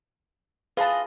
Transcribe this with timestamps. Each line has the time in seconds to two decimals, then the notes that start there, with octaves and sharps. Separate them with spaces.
0.77 F4 G#4 B4 D#5 A5